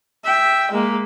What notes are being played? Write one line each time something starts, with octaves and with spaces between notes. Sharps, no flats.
E5 G5
G#3 A#3